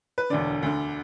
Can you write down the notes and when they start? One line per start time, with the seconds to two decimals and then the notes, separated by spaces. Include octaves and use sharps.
0.18 B4
0.30 E1 D2 D3 D5
0.63 D2 D3